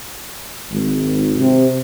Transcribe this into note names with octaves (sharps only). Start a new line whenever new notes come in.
G#1
C3